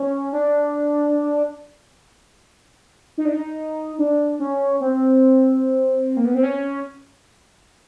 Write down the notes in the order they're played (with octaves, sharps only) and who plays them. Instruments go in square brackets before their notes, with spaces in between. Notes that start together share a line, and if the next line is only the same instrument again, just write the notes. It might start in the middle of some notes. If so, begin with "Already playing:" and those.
Already playing: [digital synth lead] C#4
D4
D#4
D4
D#4
D4
C#4
C4
A#3
B3
C4
C#4